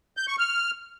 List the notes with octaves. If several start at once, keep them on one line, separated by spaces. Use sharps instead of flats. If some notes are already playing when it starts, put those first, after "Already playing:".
G6
C#6
F6